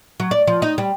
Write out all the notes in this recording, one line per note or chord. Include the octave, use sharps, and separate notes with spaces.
F#3
D5
F3
D#4
G3